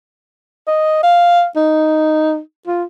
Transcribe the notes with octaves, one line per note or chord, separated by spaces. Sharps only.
D#5
F5
D#4
F4